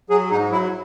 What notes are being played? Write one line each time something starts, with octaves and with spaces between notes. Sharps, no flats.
F#3 G#4
G#2 D#4
F#3 E4